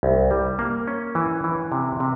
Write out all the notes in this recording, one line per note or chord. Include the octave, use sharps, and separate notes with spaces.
C2
G3
A#3
C#4
E3
E3
C3
C3